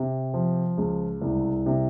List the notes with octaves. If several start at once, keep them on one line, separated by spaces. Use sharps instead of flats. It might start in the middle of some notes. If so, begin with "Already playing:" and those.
Already playing: C3
F3
C#2
C2
C3